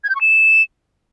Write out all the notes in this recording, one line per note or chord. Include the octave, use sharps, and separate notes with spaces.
G#6
G6
C#6
E7